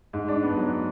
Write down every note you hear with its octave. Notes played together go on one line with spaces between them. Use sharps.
G#2
D4
B3
F#3